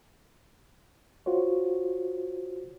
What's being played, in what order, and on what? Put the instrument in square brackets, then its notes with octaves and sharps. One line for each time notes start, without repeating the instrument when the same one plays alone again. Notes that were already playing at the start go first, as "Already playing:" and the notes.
[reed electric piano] F4 F#4 C5 C#5